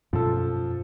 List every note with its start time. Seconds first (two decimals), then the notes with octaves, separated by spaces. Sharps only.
0.13 F#2 B2 F3 C#4 A4